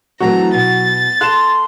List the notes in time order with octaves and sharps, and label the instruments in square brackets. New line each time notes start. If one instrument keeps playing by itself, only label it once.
[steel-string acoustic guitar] E3 A3 C4 [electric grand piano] F#3 F#4 [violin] A#5
[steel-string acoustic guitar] B2 [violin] A6
[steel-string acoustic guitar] A4 F5 [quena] C6 [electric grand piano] F#6 E7